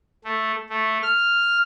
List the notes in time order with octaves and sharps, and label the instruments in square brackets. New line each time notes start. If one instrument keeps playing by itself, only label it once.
[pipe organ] A3
A3
F6